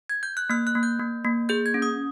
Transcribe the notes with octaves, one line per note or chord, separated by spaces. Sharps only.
G#6
G6
F#6
A#3 F6
F#6
A#3
G6
A#3
A#3
G#4 G6
G#6
C#4
D#6